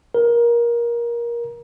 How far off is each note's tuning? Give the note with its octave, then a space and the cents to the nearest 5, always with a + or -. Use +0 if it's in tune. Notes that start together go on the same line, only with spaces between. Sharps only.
A#4 +20